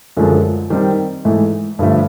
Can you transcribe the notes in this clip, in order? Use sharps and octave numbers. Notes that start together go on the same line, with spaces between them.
F#2 D3 F3 G#3
D#3 G3 C4
G#2 E3 A3
G2 D3 F3 A3